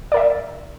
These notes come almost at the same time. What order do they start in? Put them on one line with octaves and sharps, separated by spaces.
D5 A#4 E5